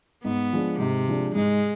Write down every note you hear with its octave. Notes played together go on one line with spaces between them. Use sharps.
G#2 B3
F3 G#3 D4
G#2 C3
F3 G#3 D4
G#2 G#3